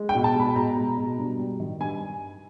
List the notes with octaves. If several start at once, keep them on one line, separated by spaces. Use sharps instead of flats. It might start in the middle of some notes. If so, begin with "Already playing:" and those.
Already playing: G#3
G5
B2
A5
G#3 B5
B2 A#5
G#3
B2
G2
G3
D#3
G2 G#5